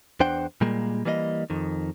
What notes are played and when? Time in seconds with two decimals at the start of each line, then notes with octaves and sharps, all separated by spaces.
0.20 E2 D4 C5 F#5 G5
0.61 A#2 G3 G#3 A#3
1.05 E3 G3 A#3 D5 D#5
1.50 F2 D#3